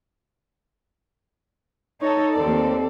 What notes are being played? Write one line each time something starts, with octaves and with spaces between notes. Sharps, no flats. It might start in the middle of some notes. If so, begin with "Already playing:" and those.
D#4 A4 C#5
D#2 C4 A4 D5